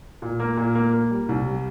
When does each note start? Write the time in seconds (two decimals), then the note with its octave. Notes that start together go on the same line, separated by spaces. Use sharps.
0.22 A#2
0.40 A#3
0.57 A#2
0.75 A#3
0.93 A#3
1.11 G3
1.29 C2
1.46 G3